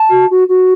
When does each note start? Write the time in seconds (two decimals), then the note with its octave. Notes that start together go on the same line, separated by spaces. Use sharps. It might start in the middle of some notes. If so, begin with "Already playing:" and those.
Already playing: A5
0.09 F#4
0.30 F#4
0.48 F#4